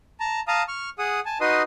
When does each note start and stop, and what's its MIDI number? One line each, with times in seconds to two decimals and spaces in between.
0.20 0.40 81
0.20 0.40 82
0.48 0.63 77
0.48 0.63 81
0.48 0.63 82
0.48 0.63 87
0.68 0.90 85
0.68 0.90 89
0.99 1.20 68
0.99 1.20 78
0.99 1.20 87
1.26 1.38 80
1.26 1.38 81
1.41 1.62 63
1.41 1.62 66
1.41 1.62 71
1.41 1.62 75
1.41 1.62 84
1.41 1.62 87